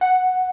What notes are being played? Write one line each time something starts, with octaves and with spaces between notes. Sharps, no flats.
F#5